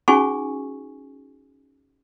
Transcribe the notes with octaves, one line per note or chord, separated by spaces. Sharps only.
C#4 D#4 F#4 G#4 G#5 C#6